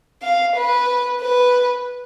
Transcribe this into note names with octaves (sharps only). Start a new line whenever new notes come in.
F5
B4
B4